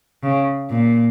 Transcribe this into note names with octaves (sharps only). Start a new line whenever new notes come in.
C#3
A#2